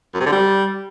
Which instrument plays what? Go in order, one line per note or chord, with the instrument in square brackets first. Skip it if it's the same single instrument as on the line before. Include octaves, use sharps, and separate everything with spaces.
[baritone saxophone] F#2
C3
D3
G3